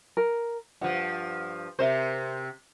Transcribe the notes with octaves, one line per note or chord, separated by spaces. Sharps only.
A#4
G2 F3 F#5
C3 A#4 C5 E5